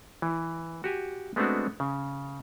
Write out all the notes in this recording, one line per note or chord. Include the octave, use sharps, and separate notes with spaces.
E3
F#4 G4 G#5
G#3 A3 B3 C4 D4 F#4
C#3